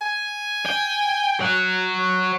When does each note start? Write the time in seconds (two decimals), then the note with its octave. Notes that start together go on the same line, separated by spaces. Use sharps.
0.01 G#5
0.66 G5
1.41 C#5 F#5